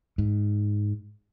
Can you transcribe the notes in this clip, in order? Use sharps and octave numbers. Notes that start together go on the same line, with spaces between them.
G#2